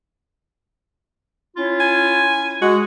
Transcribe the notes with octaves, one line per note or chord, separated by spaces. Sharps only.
C#4 E4 F4
G#5
G#3 F#4